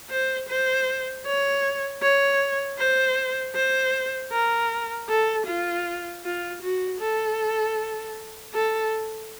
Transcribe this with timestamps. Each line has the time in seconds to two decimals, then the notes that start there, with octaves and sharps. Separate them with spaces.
0.10 C5
0.49 C5
1.25 C#5
2.02 C#5
2.79 C5
3.55 C5
4.32 A#4
5.09 A4
5.47 F4
6.24 F4
6.62 F#4
7.01 A4
8.54 A4